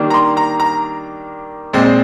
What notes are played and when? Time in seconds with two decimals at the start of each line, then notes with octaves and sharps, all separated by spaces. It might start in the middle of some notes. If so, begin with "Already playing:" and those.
Already playing: D#3 G3 A#3 D4
0.10 A#5
0.14 C6
0.37 A#5
0.60 A#5
1.73 A#2 G#3 C4